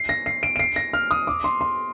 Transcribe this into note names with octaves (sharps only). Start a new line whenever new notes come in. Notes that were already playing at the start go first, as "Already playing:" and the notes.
Already playing: C7
A#6
C7
D7
D7
C7
A#6
F6
D#6
D6
C6
C6